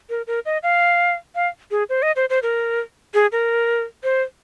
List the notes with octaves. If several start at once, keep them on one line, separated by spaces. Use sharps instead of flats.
A#4
A#4
D#5
F5
F5
G#4
C5
D#5
C5
C5
A#4
G#4
A#4
C5